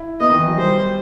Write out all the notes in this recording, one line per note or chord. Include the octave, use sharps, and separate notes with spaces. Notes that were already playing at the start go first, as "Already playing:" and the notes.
Already playing: E4
B3 D#5
D#3
E3
F#3
G3 C5